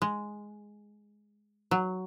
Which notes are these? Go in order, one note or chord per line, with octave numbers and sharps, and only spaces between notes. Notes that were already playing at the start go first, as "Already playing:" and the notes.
G#3
F#3